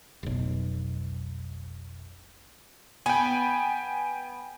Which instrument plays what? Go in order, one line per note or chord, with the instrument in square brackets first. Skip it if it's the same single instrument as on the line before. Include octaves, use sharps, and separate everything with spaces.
[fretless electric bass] F1 B1
[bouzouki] B3 [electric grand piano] G5 G#5